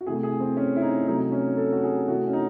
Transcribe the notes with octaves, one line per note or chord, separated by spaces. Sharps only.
F#4
C3 E3 A3 G#4
G#4
C4
C#4
E4
D#4
C3 F#3 A3 D#4
C#4
A4
F#4
G#4
C3 E3 A3 F#4
C#4
D#4